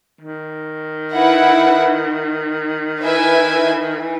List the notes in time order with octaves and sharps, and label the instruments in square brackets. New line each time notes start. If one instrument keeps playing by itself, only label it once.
[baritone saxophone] D#3
[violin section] E4 B4 F#5
E4 B4 E5 G#5
[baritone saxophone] E3